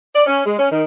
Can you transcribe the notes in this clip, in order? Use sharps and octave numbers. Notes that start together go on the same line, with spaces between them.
D5
C#4
G#3
C#4
D#3